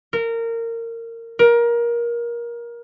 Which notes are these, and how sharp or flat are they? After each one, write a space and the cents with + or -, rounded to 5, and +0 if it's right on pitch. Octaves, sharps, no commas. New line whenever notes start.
A#4 -20
A#4 +20